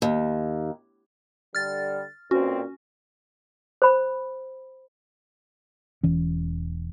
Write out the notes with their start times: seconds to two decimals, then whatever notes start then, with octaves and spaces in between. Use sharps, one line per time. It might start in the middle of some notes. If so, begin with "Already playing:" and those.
0.02 D#2
1.55 D3 G3 F6 A6
2.31 B1 A#2 C4 C#4 F#4
3.82 C5 B5
6.03 E1 E3 C#4